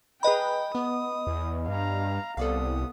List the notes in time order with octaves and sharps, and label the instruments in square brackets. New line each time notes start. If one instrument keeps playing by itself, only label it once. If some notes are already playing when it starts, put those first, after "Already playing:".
[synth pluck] G#4 B4 A#5 [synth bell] D#5 B5 [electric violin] G5
[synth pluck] B3 [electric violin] D#6
[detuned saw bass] E2
[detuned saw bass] G2 [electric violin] F5 A#5
[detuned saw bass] C2 [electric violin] B3 D#6 [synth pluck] A4 D5 F5